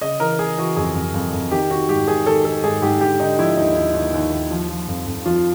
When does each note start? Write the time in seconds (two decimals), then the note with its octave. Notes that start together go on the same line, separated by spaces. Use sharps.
0.01 C#3 D#5
0.20 E3 A#4
0.39 C#3 G#4
0.58 E3 F#4
0.76 F2 G#4
0.95 F2
1.14 F2
1.33 F2
1.51 D#3 G4
1.70 D#3 F#4
1.89 G#2 G4
2.08 D#3 G#4
2.26 D#3 A4
2.45 D#3 A4
2.64 G#2 G#4
2.82 G#2 G4
3.01 D3 G4
3.20 D3 D#4
3.38 F3 E4
3.57 D#2 D#4
3.76 D#2
3.95 D#2
4.14 D#2
4.32 D#2
4.51 F3
4.69 F3
4.88 F2
5.07 F2
5.26 F3 F4